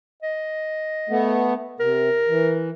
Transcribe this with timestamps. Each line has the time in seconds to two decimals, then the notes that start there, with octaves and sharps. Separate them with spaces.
0.23 D#5
1.09 A3 B3
1.80 C3 A#4
2.28 E3